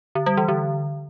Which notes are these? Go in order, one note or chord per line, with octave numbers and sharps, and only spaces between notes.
D3
G3
E3
D3